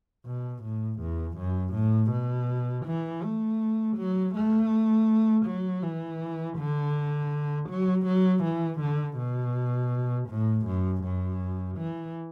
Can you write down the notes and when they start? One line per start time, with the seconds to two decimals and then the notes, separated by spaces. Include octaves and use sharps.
0.26 B2
0.63 A2
1.00 E2
1.37 F#2
1.74 A2
2.11 B2
2.86 E3
3.23 A3
3.97 F#3
4.35 A3
5.46 F#3
5.83 E3
6.58 D3
7.69 F#3
8.06 F#3
8.44 E3
8.80 D3
9.17 B2
10.29 A2
10.66 F#2
11.04 F#2
11.78 E3